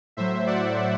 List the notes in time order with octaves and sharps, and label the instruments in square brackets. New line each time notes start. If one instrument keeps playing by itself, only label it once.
[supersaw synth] A2 F#3 C5 E5
D5 F#5